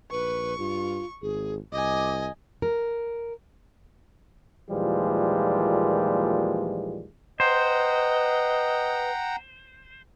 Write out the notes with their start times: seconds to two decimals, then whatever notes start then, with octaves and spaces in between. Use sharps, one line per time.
0.11 A#1 B4 C#6
0.58 G2 F4
1.22 G#1 G#4
1.72 C2 D#5 G#5 D6
2.62 A#4
4.70 D#2 A#2 E3 F3 G3 G#3
7.40 B4 C5 D#5 F#5 G5 A#5